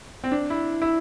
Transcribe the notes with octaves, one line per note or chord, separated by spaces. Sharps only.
C4
D4
E4
E4